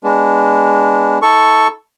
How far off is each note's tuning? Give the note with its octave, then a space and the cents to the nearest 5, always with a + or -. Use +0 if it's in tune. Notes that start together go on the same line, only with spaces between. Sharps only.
G#3 -15 B3 +0 D4 -20
D#4 +45 A4 +0 C#6 +0